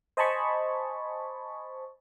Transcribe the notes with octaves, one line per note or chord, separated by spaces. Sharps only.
C5 D#5 G#5 A5 B5 C#6